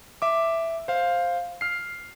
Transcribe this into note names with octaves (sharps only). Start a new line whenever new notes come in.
E5 D6
C5 F5
F6 C7